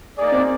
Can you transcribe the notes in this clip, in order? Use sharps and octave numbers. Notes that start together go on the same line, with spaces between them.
A#3 D#4 G#4 D5
C4